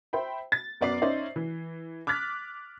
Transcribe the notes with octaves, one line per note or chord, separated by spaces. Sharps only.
C5 E5 G5 B5
A6
F#2 B3 D5 D6 C7
C#4 D#4 C5 D5 E5
E3
D6 F6 F#6 A6 B6